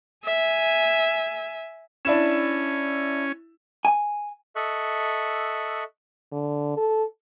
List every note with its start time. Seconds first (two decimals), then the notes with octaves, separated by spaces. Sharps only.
0.25 E5 G#5
2.05 C#4 D4 E4 E7
3.85 G#5
4.56 A4 D#5 E5 C#6 F#6
6.32 D3
6.77 A4